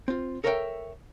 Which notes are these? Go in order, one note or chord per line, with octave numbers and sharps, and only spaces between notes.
C4 F4
A4 A#4 C#5 E5 F5 G5